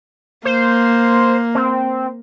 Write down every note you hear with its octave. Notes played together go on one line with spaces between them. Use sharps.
A#3 C5
C4